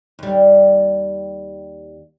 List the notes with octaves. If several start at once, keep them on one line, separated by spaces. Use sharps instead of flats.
D#2 G3